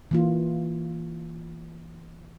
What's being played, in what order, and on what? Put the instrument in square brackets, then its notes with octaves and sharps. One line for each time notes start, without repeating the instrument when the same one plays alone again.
[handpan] E3 A#3 F4